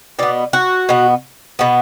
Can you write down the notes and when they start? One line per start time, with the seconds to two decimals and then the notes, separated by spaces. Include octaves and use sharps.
0.19 B2 B3 D5
0.53 F#4
0.89 B2 B3
1.59 B2 B3